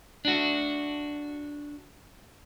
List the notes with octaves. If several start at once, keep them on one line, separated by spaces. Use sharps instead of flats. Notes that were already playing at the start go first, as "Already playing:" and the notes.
D4 F#4